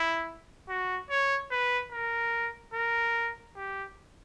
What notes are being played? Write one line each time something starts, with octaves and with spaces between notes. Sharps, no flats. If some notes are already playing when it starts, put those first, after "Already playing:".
Already playing: E4
F#4
C#5
B4
A#4
A#4
G4